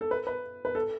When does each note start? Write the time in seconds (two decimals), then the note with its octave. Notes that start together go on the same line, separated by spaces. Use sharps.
0.01 A4
0.11 B4
0.27 B4
0.65 B4
0.75 A4